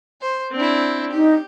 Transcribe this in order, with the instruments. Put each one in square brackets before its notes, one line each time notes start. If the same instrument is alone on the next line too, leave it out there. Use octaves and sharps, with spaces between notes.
[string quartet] C5
C4 D4 E4
[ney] D#4 [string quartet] G4